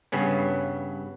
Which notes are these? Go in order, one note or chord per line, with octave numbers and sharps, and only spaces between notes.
G2 C#3 B3 C#4